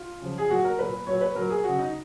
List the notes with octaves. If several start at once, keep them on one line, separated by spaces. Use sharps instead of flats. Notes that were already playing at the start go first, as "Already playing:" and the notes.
Already playing: F4
C#3 F3
G#4
A#2 F#3 F#4
A#4
A#2 F#3 B4
A#2 F#3 C#5
B4
A#2 F#3 A#4
G#4
C#3 F#3 F#4
D#4